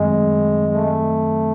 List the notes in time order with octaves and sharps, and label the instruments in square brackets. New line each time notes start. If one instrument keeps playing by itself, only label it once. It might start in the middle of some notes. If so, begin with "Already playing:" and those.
Already playing: [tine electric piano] F#2 D#3 F#3 A3 C4 [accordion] G#3
[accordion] A3